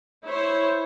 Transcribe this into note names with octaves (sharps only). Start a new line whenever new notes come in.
E4 C5 C#5